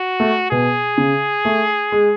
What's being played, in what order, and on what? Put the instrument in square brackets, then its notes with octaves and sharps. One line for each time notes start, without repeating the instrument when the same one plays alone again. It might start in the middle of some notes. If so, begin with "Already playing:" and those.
Already playing: [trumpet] F#4
[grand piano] A3
[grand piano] B2 [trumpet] G#4
[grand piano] C#3
A3
G#3